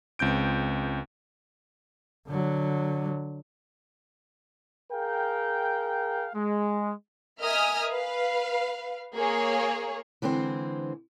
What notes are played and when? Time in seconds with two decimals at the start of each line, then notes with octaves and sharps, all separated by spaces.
0.19 C#2 C4 G6 D7
2.28 D3 F#3
4.92 G#4 A#4 F5 G5
6.35 G#3
7.42 A#4 D#5 E5 G#5 D#6 F6
7.90 B4 F5
9.15 A#3 G#4 C#5
10.22 D3 E3 G#3 C4 G4 C5